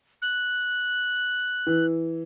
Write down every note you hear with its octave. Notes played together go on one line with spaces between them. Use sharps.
F#6
E3